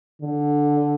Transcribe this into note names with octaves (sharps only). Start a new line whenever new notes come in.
D3